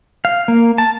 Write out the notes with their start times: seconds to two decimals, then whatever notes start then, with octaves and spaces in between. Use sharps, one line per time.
0.25 F5
0.48 A#3
0.78 A5